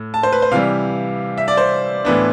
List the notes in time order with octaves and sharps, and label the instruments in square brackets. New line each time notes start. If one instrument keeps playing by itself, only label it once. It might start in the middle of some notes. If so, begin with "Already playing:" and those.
Already playing: [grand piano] A2
A5
C5
B4
C5
C3 E3 G3 F5
E5
D5
C5
A2 E3 B3 D4